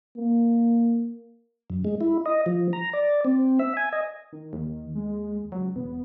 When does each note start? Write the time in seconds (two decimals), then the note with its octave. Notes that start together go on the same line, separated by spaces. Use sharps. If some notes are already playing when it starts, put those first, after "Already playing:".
0.17 A#3
1.70 F#2
1.85 G#3
2.01 E4
2.26 D#5
2.46 F3
2.73 A#5
2.93 D5
3.25 C4
3.59 E5
3.77 G#5
3.92 D#5
4.33 D#3
4.53 D#2
4.95 G#3
5.52 C#2 F#3
5.76 E1 B3